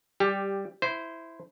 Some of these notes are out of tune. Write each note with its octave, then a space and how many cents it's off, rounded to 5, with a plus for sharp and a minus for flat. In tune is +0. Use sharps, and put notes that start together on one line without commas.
G3 +0 G4 +15
E4 +0 C5 -15